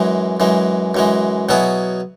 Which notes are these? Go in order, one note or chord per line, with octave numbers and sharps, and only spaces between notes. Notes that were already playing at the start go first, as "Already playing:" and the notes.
Already playing: F#2 E3 G#3
F#2 E3 G#3
F#2 E3 G#3
B2 F#3 B3 E4 G#4